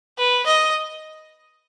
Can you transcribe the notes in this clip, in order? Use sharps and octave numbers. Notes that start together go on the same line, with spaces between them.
B4
D#5